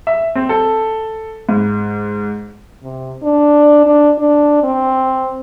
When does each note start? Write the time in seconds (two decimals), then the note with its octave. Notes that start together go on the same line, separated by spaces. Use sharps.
0.07 E5
0.35 C4
0.49 A4
1.49 G#2
2.83 C3
3.23 D4
3.86 D4
4.18 D4
4.64 C4